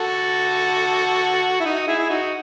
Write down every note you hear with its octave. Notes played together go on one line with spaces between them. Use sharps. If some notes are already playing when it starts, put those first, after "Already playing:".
Already playing: F#4 A4
E4
D#4 F#4
E4 G#4
E4
D#4 F#4